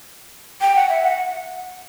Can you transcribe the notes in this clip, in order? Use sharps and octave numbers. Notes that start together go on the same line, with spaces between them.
G5
F#5
E5
F#5